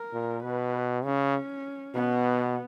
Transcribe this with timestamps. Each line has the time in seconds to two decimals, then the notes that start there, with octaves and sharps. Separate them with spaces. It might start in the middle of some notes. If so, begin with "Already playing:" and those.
Already playing: A#4
0.13 A#2
0.43 B2 B4
1.04 C#3 C#4
1.94 B2 B3